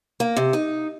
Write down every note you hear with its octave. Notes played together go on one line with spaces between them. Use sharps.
A#3
C3
D#4